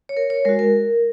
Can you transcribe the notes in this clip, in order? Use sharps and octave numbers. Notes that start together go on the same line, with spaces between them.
C#5
A#4
C#5
G#3 F#4 A#4
A#4